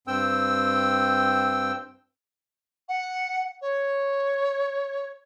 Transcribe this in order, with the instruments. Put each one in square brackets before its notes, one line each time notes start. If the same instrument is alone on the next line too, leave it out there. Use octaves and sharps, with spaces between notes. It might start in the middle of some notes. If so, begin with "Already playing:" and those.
[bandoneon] G2 C4 G5 E6
[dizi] F#5
C#5